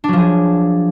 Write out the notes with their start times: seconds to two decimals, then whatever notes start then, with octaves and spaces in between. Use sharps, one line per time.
0.04 D4
0.08 F#3
0.13 F3
0.18 G#4